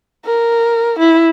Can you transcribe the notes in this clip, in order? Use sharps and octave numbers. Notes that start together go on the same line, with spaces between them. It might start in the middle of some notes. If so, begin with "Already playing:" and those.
A#4
E4